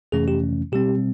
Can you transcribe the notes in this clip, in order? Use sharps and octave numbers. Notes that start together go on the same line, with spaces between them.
F2 C3 E3 A3 C#4 G#4
G4
B2 G3 C4 G4